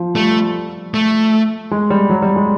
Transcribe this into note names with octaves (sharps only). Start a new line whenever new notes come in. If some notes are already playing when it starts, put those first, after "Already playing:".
Already playing: F3
G3 A3
A3
G#3
G3
F#3
G3
G#3